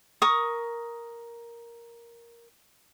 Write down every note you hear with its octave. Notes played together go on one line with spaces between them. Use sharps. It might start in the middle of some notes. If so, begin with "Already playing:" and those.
A#4 C#6 D#6